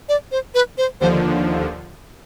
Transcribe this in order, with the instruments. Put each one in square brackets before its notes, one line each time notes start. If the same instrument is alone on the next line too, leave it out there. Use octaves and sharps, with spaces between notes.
[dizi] D5
C5
B4
C5
[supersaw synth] D#2 D3 F3 [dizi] C5